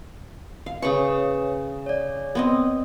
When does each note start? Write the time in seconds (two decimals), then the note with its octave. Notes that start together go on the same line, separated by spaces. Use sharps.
0.66 F5
0.82 C#3 B4 C#5 B5 C#6 D#6
1.86 C#5 D5
2.35 B3 C4 D#5